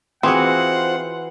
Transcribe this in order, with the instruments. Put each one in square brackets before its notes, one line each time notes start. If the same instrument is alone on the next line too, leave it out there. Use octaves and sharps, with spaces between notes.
[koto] E3 F#4 [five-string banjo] C4 G#4 [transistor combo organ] F4 C5 [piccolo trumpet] F#5